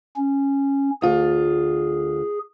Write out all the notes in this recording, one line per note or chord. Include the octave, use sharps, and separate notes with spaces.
C#4
D2 F4 G#4